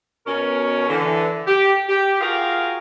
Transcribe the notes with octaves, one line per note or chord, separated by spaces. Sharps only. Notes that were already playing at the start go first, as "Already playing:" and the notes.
B2 C#4 A#4
D3 E3
G4
G4
F4 F#4 G#4 A#4 F5 G5